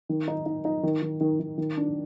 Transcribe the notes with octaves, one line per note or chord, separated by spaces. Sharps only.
D#3
D#4
D#4
D#4
D#3
D#3
D#3
D#3
D#3
D4